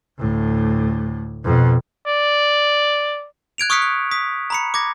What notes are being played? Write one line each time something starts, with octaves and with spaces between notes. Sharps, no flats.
D2 A2
F2 B2
D5
F#6 G#6 D7 F7
C#6 D#6 F6 F#6 B6 C#7
F#6
D#6 B6
A#5 B5 C#7
D6 G#6 A#6